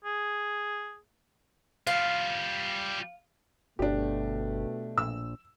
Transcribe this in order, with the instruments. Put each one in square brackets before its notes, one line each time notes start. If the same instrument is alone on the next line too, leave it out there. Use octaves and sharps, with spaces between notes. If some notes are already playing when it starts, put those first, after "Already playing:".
[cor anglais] G#4
[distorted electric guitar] G3 F4 [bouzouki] F5
[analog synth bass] G1 [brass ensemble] B2 A3 [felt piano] D4 G4
[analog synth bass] A#1 [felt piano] E6